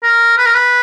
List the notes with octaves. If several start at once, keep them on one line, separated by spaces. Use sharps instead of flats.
A#4
B4
A#4
B4